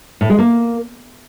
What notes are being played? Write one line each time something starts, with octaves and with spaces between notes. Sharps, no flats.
A2
G#3
A#3